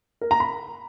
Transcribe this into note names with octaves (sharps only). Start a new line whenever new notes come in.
A#4
A#5
B5